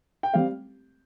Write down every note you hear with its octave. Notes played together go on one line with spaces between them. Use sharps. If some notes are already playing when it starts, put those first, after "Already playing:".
G5
G3 C4 G4 F5